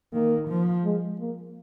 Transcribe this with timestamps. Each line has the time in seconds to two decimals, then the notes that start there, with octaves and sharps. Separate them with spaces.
0.13 D#3 A#3
0.49 F3
0.85 G#3
1.20 A#3